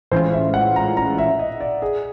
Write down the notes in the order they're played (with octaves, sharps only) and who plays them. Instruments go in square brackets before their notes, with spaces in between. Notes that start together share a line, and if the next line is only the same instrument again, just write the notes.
[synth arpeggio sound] A2 E3 G#3 C#4 F4 [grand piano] C5
[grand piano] E5
F#5
A#5
A#5
E5
D#5
D5
G#4